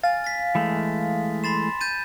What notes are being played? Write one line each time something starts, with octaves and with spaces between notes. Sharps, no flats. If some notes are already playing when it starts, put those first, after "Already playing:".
F5 G#5 A6
A6 B6
E3 G#3 A3
B5 C6 A6 E7
G6 A6 D#7